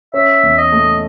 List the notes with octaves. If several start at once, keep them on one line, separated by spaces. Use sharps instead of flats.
C#4 E5
E2
D#5
A3